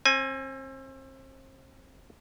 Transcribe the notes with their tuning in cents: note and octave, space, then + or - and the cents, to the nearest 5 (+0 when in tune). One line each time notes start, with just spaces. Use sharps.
C4 +35 G#5 +0